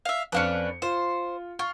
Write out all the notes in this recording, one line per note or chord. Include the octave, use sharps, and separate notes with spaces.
E5 F5
F2 C#4 D4 B4 F5 C#7
F4 C5
F4 C#6